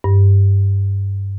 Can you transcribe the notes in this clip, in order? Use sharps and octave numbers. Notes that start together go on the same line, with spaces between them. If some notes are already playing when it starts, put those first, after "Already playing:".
G2